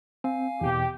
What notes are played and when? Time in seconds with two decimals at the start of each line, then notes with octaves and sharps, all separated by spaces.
0.24 C4 F5 G#5
0.61 E2 B2 G4